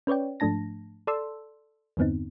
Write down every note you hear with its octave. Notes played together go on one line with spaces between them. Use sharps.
C#4 B4 C#5 D5 G5
G#2 F3 A3 D4 A5 A#6
A4 D5 A5 C6 E6
E2 G2 D3 B3 C4 D#4